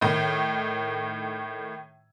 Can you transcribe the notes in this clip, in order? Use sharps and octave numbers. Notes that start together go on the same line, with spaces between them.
A2 D#3